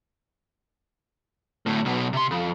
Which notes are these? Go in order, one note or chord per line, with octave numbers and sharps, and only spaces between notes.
D2 A2
B1 B2
C3 C6
F2